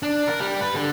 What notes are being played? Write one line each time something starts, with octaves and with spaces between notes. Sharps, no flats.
D4
A#4
G3
B4
D3